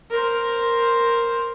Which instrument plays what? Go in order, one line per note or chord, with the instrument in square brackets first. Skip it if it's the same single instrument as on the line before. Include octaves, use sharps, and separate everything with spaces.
[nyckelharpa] A#4 C5